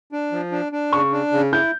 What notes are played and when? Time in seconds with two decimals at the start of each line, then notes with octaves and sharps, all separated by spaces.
0.12 D4
0.32 F3
0.52 D4
0.72 D4
0.93 C#3 C#6
1.12 D4
1.32 C#3
1.53 E4 G6